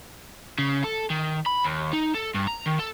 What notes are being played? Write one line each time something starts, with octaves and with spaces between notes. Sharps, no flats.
C#3
A4
D#3
B5
D#2
D#4
A4
G2
A#5
D#3
A4